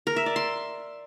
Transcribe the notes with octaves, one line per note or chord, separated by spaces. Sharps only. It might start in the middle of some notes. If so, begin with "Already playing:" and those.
A#4
E5
D5
C6